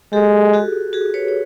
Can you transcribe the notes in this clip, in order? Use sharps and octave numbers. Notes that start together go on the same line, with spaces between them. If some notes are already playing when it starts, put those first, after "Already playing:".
G#3 G4 A4
F#4 G#4
F#4 G#4
B4 C#5
C#5